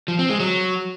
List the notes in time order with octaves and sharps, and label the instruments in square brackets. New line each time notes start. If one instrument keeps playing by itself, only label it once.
[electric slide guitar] F3
C4
G#3
F#3